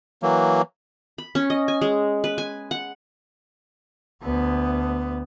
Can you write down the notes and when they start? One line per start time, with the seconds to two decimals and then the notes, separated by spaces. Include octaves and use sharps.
0.23 E3 F#3 A#3
1.18 B5
1.35 C#4
1.50 D#5
1.68 G#5
1.82 G#3
2.24 B4
2.38 G#5
2.71 F#5
4.23 D2 B3